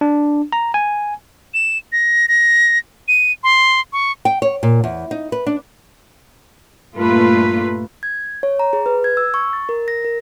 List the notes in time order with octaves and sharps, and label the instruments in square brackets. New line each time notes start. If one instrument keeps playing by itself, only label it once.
[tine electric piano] D4
A#5
G#5
[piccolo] E7
A#6
A#6
D#7
C6
C#6
[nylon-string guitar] G5
C#5
A#2
E2
D#4
B4
D4
[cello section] G2 A#2 A3 A#3 F4 B4
[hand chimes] G#6
C#5
A#5
G#4
B4
G#6
E6
C#6
A6
A#4
A#6
A#4